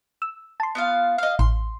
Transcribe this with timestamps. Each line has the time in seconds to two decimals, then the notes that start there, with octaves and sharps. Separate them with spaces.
0.22 E6
0.60 A5 C6
0.75 B3 F4 F5
1.18 D#5 F5
1.39 A1 C6